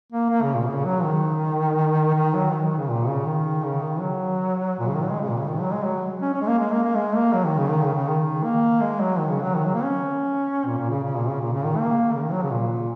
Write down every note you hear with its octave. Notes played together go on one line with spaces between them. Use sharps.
A#3
A#3
C#3
A#2
C#3
F#3
D#3
D#3
F#3
D#3
D#3
C#3
A#2
C#3
D#3
C#3
D#3
F#3
A#2
C#3
D#3
F#3
G#3
C#3
A#2
C#3
D#3
F#3
G#3
F#3
C#4
C#4
G#3
A#3
G#3
A#3
A#3
G#3
A#3
F#3
D#3
C#3
D#3
C#3
C#3
D#3
A#3
G#3
F#3
D#3
C#3
F#3
D#3
F#3
A#3
C#4
A#2
A#2
C#3
C#3
A#2
C#3
A#2
C#3
D#3
A#3
C#3
D#3
F#3
C#3
A#2